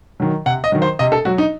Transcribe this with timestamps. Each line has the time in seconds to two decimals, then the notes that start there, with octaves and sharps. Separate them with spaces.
0.20 D#3 F#3
0.46 C3 F#5
0.64 D#5
0.72 D#3 F#3
0.82 C5
0.99 C3 D#5
1.12 A4
1.25 F#3 F#4
1.38 D#4